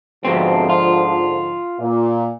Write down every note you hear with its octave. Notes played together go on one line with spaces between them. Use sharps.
F2 G#2 B2 D3 F3 C4
F4
A#2